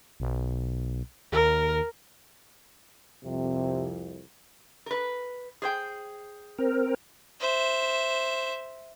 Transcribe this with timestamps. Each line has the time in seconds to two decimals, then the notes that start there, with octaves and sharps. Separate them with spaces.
0.20 B1
1.32 D#2 A#4
3.24 C2 F2 C3
4.86 A#4 B4
5.62 G#4 C5 G5
6.58 C4 A#4
7.41 C5 E5